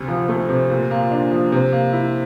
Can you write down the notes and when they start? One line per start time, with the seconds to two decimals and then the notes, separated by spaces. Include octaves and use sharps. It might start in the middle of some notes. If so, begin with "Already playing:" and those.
Already playing: D2 C3
0.08 F3
0.29 A3
0.49 C3
0.70 A#2
0.91 A#3
1.11 D4
1.31 F3
1.52 C3
1.72 A#3
1.93 E4